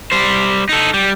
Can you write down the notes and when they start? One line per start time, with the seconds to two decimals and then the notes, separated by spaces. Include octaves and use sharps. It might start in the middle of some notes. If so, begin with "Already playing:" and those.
0.12 G3 C5
0.69 D#4 A4
0.94 G3